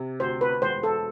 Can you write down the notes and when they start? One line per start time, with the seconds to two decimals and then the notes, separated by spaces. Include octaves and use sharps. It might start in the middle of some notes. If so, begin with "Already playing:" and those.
Already playing: C3
0.20 D2 C5
0.41 B4
0.62 E1 C5
0.83 A4